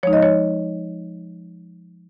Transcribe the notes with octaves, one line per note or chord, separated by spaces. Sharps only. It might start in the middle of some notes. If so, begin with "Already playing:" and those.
F3 G#3 D#4 C#5
D#5
C#5